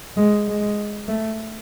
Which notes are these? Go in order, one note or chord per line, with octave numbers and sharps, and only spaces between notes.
G#3
G#3
A3